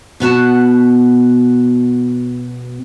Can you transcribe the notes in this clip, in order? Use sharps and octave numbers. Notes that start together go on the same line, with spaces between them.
B2 B3 F#4 A5